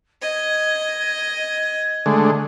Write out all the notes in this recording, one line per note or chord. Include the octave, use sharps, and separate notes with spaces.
D#5 G#6
D3 G#3 A3